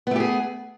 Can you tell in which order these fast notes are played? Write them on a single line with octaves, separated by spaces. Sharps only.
B3 A3 G4 G#4